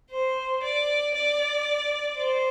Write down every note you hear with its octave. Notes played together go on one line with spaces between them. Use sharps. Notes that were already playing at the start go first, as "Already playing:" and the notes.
C5
D5
D5
C5